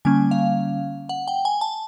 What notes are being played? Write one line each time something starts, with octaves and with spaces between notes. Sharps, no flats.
D3 G3 A#3 C#4 G#5
F5
F#5
G5
G#5
A5